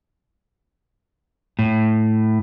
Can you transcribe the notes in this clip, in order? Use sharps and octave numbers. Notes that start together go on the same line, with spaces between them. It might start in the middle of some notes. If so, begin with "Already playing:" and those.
A2